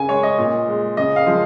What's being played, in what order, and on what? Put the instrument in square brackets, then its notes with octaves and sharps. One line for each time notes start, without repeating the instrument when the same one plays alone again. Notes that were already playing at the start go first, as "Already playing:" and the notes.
Already playing: [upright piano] C#3 G#5
G#3 C#5
D#5
A#2
G#3
C#3 D#5
F5
F3 G#3